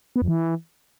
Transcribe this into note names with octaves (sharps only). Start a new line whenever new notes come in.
B3
F2
E3